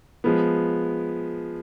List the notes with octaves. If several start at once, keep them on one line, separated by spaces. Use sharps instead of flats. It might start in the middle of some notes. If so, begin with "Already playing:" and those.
F3 G#3 B3